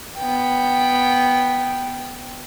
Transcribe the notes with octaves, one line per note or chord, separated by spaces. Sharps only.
B3 G5